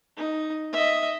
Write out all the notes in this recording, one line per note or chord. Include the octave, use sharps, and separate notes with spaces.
D#4
D#5 E5